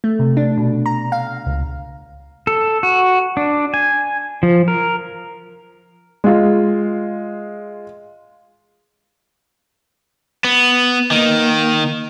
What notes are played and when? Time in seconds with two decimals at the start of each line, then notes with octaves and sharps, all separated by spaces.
0.04 A3
0.19 C3
0.37 D4
0.58 B2
0.86 A#5
1.12 F5
1.46 C#2
2.47 A4
2.83 F#4
3.37 D4
3.74 G#5
4.43 F3
4.68 A#4
6.24 G#3 F4
10.44 B3
11.11 D#3 A#3